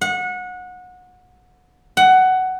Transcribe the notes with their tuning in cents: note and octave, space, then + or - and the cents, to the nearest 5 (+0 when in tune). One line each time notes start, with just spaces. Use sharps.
F#5 -25
F#5 +15